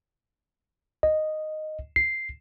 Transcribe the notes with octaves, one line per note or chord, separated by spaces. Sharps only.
D#5
C7